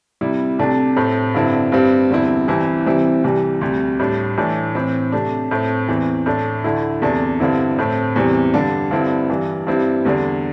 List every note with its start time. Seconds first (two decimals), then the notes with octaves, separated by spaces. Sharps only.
0.21 C3 G3 E4
0.59 C2 C3 A3 D4
0.97 A2 A3 C4
1.34 G2 D3 C4 E4
1.72 G2 G3 C4
2.10 E2 D3 G3 C4 E4
2.48 C2 C3 E3 C4 E4
2.86 C3 E3 G3 C4 E4
3.24 C2 C3 E3 G3
3.61 D2 C3 G3
3.99 A2 G3 D4
4.37 A2 E3 A3 D4
4.75 A2 E3 C4
5.12 C3 A3 D4
5.51 A2 A3 C4
5.88 E2 E3 C4
6.26 A2 A3 D4
6.64 D2 D3 A3 E4
7.02 E2 C3 A3 D4
7.40 G2 D3 C4 E4
7.78 A2 A3 C4
8.16 E2 C3 E3 G3 C4
8.54 G2 D3 G3 D4
8.91 G2 D3 C4 E4
9.29 G2 E3 G3
9.67 G2 G3 C4 E4
10.05 E2 D3 G3 D4